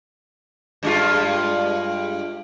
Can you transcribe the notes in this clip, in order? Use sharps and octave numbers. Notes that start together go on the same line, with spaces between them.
G2 G#3 F4